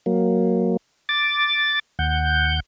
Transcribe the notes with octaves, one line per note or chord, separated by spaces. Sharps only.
F#3 A#3
D6 A6
D#2 F#5 G6